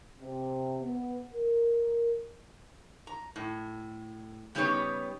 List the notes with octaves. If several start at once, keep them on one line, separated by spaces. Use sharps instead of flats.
C3
B3
A#4
A#5
A2
C#3 G3 B3 D#4 G4 C#5